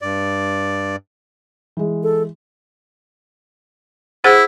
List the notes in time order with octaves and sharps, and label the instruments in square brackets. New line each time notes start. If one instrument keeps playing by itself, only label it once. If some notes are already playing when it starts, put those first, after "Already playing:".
[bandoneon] G2 D5
[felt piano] E3 G#3
[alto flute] A4
[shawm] E4 [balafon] G#4 C5 F#5